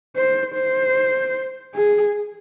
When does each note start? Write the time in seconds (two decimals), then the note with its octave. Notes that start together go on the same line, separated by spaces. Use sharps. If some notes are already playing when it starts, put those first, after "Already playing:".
0.16 C5
0.55 C5
1.74 G#4